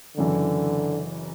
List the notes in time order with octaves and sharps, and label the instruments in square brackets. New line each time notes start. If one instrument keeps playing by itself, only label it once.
[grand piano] F#1 F#2 E3 [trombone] D3